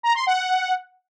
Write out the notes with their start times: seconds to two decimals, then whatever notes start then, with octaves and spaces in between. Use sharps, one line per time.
0.03 A#5
0.15 C6
0.27 F#5